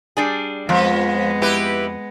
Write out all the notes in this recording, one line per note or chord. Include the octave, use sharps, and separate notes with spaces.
G3 D4 G#4
F2 F3 G#3 B3
E4 G4 B4